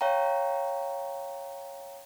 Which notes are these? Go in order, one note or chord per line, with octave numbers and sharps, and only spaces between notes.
C#5 F5 G5 A#5